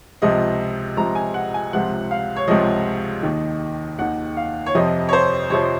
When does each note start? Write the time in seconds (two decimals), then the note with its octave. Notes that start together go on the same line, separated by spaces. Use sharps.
0.22 C#2 C3 F3 D#5
0.97 C#2 C3 F3 A#5
1.15 G#5
1.34 F#5
1.54 G#5
1.73 C#2 C3 F3 F#5
2.11 F5
2.36 C#5
2.47 C#2 C3 F3 D#5
3.23 D#2 D#3
3.99 D#2 D#3 F#5
4.37 F5
4.66 C#5
4.75 F2 C3 F3 D#5
5.09 C#5
5.13 C5
5.50 F2 C3 F3 C#5